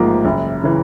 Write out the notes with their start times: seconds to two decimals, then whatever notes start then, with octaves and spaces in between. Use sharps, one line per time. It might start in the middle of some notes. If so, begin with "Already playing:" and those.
Already playing: A1 G#2 F3 A#3
0.25 F#1
0.63 C#3 E3